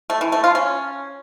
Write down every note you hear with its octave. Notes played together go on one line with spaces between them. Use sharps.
A3
E3
A3
F4
C#4